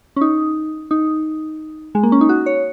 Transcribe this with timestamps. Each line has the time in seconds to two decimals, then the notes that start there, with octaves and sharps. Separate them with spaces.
0.16 C#4
0.21 D#4
0.91 D#4
1.95 G#3
2.03 A#3
2.12 C#4
2.21 D#4
2.29 F#4
2.46 C#5